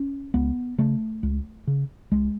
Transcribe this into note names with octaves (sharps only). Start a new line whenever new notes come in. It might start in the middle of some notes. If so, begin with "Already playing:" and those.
Already playing: C#4
C#2 B3
C#3 A3
C#2
C#3
C#2 G#3